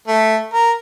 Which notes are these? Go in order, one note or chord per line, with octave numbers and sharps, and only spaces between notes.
A3
A#4